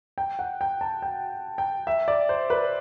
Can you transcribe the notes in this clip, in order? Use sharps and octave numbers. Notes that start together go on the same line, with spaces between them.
G5
F#5
G5
A5
G5
G5
E5
D5
C5
B4